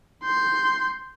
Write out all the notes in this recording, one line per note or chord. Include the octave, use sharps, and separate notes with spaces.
C6 G6